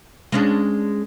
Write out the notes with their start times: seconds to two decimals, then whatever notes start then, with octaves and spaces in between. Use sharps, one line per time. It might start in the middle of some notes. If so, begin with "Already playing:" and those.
0.32 G#3 C#4 D4